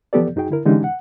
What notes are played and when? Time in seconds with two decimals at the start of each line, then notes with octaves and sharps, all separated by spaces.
0.13 E3 F3 B3 G4 A4 D5
0.36 F#2 D#4 F#4 G#4 G5
0.50 D3 E4 A#4
0.65 D3 E3 G#3 C#4 D#4 G4
0.84 F#5